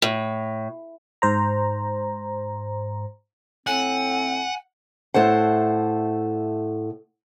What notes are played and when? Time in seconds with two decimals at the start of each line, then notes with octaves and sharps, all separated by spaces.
0.02 A2
1.22 G#2 C5 A#5
3.67 A2 C4 F#5 G#5
5.14 A2 A4 C5 F#5